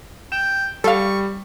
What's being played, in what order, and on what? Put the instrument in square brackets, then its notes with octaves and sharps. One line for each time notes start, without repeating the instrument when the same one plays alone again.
[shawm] G5 [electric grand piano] E7
[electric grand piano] G3 [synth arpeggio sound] A4 F5 [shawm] C#6